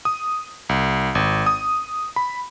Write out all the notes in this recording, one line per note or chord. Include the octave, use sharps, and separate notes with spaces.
D#6
C2
G#1
D#6
B5